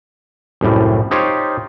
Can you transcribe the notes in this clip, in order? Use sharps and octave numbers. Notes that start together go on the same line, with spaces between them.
C2 F#2 A2 G3
D#4 F4 G4 C5 C#5